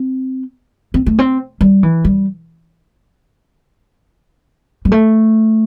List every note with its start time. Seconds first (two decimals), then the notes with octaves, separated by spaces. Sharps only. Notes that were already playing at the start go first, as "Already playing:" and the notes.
Already playing: C4
0.94 C4
1.06 A3
1.19 C4
1.61 G3
1.83 E3
2.05 G3
4.85 G3
4.92 A3